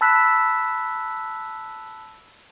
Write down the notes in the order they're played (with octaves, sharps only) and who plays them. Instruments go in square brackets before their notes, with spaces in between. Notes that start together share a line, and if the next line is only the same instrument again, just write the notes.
[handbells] A5 B5 E6 F#6 B6